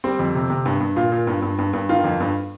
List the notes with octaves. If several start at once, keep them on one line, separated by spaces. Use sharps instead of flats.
G3 C4
F2
C3
C3
G2
G2
A#2 F4
A#2
G2
G2
G2
G2
D#3 F4
F2
G2